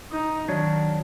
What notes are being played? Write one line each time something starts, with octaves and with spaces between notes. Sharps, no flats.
D#4
D#3 F#3 D4 C#5